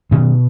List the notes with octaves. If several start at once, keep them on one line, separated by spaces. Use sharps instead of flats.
B2 D#3